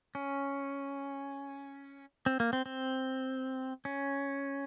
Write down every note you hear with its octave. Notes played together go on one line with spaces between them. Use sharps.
C#4
C4
A#3
C4
C4
C#4